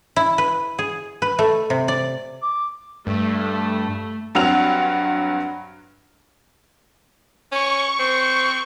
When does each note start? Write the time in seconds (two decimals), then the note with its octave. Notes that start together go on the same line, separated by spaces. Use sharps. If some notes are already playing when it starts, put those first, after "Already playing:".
0.16 E4
0.38 B4
0.79 G#4
1.22 B4
1.39 A3
1.70 C3
1.88 D5
2.42 D6
3.07 G2 A3
4.35 G2 F#3 C4 F#5 F6 F7
7.52 C#4 C#6
7.99 C4